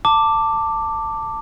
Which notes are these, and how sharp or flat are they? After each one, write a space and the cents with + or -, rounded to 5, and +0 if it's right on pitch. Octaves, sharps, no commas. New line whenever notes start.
A5 +20 D6 +0